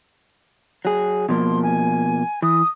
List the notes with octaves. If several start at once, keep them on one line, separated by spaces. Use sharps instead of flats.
F#3 G#4
B2 F3 A#3 C6
G#5
E3 D#6